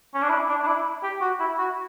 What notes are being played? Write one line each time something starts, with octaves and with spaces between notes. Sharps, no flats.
C#4
D4
E4
D4
D4
E4
G4
F#4
E4
F#4